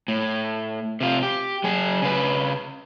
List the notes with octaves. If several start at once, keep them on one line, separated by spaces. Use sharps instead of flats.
A2
C3 F4
G4
F#3 G#4
C#3 B4